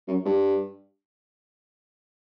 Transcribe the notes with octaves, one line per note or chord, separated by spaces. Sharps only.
F#2
G2